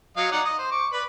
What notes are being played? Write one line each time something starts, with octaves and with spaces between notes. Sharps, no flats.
F#3 D#5 F5
D#4 D5 F#5
D#5
C5
C#6 D6
B4 D5 B5